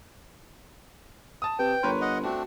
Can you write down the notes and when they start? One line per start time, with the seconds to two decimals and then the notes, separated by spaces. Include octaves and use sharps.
1.42 A5 D#6
1.59 C3 B4 G5
1.83 G1 A#4 B4 C#5 C6
2.01 D#5 F#5
2.23 A3 C4 D4 F#4